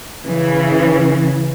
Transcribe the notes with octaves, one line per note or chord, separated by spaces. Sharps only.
C#3 E3